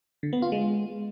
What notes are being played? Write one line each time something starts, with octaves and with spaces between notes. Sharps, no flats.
D3
B3
F4
G#3